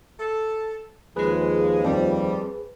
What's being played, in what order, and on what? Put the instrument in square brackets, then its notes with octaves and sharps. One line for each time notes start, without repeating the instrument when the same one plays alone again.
[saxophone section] A4
[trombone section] D#2 F3 [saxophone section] G#3 [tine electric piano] G#4 B4
[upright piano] F2 [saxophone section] G3